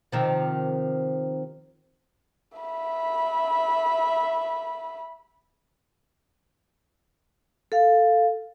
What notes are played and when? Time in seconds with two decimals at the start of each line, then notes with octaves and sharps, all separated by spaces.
0.12 C3 D#3 F3
2.58 E5 B5
7.72 A4 F5